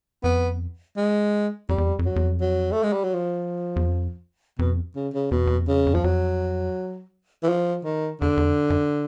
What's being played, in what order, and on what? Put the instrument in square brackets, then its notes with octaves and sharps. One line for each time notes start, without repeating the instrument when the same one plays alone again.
[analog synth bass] F2 [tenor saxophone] B3
[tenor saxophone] G#3
[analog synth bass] F2 [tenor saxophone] G3
[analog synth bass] E2
F2
F2
[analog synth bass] F#2 [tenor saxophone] F#3
[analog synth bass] E2
F2
[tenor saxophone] F#3
A3
G#3
G3
F#3
F3
[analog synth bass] E2
F2
[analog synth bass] F2 [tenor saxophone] B2
[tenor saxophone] C#3
C#3
[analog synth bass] E2 [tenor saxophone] B2
[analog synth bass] F2
E2
F2
E2
[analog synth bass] F2 [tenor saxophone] C#3
[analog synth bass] E2
F2
[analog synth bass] E2 [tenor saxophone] F3
[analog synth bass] F2 [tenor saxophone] F#3
[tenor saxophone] E3
F3
D#3
[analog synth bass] E2 [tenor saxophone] D3
[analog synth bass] E2
F2
F#2